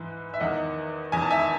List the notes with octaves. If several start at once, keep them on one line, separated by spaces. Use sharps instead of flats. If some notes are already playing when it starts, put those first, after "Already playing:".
Already playing: G#2 E3
E5
E2 D#3 D#5 F#5
E2 D#3 G#5
A5
E5 G#5